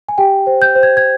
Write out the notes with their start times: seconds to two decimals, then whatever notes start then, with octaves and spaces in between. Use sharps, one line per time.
0.08 G#5
0.18 G4 G5
0.47 C5
0.62 G6
0.75 C5
0.83 G#6
0.97 G#6